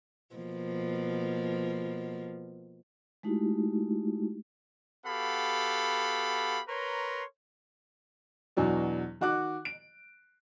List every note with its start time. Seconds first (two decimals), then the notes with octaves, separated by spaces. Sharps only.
0.35 B2 F3 A#3
3.23 G#3 A3 D#4 E4 F#4 G4
5.06 B3 F#4 G4 A4 F5 B5
6.68 A#4 B4 C#5 A#5 C6
8.57 E2 B2 F#3 D4
9.21 D#3 F#4 F#5 D6 F#6
9.65 D7